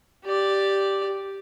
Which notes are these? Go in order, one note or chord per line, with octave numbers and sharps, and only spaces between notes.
G4 D5